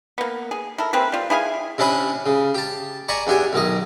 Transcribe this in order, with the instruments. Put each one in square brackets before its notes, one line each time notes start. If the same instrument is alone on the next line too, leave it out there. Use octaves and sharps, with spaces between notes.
[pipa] A#3 B3
G#4
E4 A4 A#4
A#3 C4 G#4 B4
G3 F4
E4 G#4 F5 G#5
[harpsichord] C3 C#4 D4 A5 B5 D#6
C#3
G4 A5
D5 G#5 A#5 B5 C#6
E2 D4 G4 G#5
B1 D#3 D#5